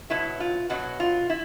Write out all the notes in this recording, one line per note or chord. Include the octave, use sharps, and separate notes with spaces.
B2 F#3 E4
F4
B2 F#3 F#4
F4
E4